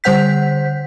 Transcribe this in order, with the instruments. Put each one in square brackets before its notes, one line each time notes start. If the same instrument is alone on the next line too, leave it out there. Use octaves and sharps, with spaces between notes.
[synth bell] D3 G3 C5 F#5 G6 B6